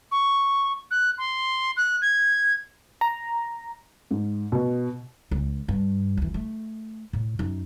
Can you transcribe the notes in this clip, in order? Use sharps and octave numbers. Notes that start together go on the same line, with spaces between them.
C#6
F#6
C6
F#6
G#6
A#5
G#2
B2
C#2
G2
D2 E3
A3
A2
F#2 D#4